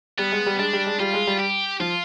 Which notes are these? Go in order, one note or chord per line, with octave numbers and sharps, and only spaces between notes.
G3 B3
G#3
G3
G#3 D4
G3
G#3
G3 F4
G#3
G3
G4
F3 F4